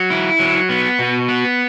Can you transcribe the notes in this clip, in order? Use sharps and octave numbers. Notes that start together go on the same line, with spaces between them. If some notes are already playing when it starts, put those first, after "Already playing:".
Already playing: F#3
E4
F#3
B3
B2
B3